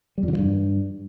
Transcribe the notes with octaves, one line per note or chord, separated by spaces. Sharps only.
G3
F2
D3
F3
G2